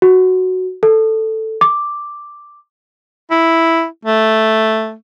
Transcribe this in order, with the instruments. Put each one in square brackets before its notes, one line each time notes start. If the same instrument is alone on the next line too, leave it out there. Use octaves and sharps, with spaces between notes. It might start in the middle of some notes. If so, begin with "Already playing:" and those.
[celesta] F#4
A4
D6
[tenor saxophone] E4
A3